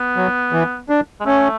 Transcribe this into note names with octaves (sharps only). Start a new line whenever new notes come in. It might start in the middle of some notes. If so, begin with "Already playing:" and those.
Already playing: B3
F#3
E3
D4
G#3
A3 C#4